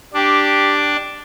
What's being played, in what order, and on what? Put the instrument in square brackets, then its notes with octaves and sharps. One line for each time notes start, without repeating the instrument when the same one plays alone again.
[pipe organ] D4 [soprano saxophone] G4